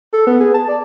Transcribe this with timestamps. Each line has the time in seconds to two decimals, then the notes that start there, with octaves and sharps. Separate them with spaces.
0.13 A4
0.27 B3
0.40 G#4
0.54 A5
0.68 D5